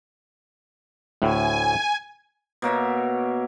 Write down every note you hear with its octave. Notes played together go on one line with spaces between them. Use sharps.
D2 A2 G#5
B2 A#3 C#5 E5